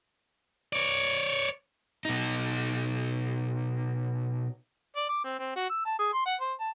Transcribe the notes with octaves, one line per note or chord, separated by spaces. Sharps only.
C#5 D5
B2 D#4
D5
D6
C4
C4
F#4
E6
A5
G#4
C6
F#5
C5
A5